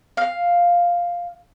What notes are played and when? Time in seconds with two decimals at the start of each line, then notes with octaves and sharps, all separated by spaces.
0.17 F5